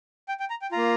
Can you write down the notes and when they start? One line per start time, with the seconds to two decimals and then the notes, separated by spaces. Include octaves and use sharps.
0.28 G5
0.40 G5
0.50 A#5
0.62 G5
0.72 A#3 F4 A#5